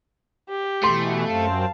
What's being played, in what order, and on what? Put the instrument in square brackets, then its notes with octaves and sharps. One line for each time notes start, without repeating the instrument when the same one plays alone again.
[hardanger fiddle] G4
[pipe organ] B2 E3 [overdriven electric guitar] A3 [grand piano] C6
[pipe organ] F#2 C4 [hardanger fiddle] F5 A5